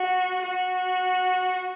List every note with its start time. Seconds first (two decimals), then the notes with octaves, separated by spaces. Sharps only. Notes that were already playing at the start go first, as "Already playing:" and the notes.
Already playing: F#4
0.42 F#4